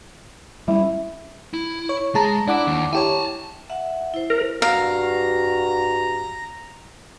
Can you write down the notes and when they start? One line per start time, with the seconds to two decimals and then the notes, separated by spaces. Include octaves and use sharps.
0.68 G3 A#3 C#4 E4
1.54 E4
1.89 C#5
2.15 G#3 G#4 A5 A#5
2.48 D4 E4 E5 F#5 D6
2.67 D#2
2.93 E4 G4 C#5 G#5 A5
3.70 E5 F#5
4.14 E4 C5
4.30 A#4
4.62 G2 F#4 F5 A#5